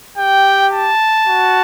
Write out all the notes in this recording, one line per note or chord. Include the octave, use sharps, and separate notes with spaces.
G4 G5
A5
F#4